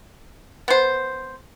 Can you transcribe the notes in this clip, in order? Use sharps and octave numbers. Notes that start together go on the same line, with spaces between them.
B3 C5